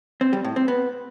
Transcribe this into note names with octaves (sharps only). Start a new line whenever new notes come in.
C4
G3
A2
C4
B3